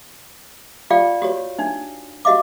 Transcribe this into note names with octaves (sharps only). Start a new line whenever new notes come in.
F4 G4 D5 F5 G5
F#4 G4 C#5
D4 D#4
F#4 G4 D#5 F5 D6